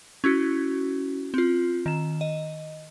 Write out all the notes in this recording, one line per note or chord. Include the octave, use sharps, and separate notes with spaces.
C#4 E4 F#4
C4 F4
D#3 E7
D#5